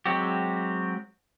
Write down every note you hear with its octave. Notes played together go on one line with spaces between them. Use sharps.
F#3 G#3 C4 F#4 G4